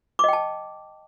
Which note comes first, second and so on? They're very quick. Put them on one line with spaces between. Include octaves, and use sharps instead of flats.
D6 D#5 G5 A5